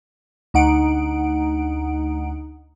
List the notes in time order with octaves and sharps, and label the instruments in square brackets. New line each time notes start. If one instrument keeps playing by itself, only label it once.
[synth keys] D2 D#4 F#5 D7